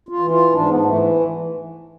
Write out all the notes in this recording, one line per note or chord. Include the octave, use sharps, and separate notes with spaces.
F4
E3
F4
G#2 D4
B3
B3
E3 A3